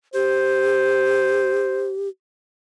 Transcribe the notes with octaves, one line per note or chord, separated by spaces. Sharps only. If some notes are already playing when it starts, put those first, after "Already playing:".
G4 C5